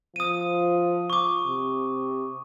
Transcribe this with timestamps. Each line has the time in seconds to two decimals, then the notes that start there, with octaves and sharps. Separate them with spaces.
0.16 F3 D#6 D#7
1.10 C#6 D6
1.46 C3